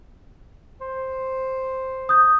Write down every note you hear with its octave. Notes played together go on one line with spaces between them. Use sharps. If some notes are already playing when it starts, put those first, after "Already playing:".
C5
D#6 G6